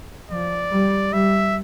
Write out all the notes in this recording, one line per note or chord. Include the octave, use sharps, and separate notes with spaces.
F3 D5
G3
G3 E5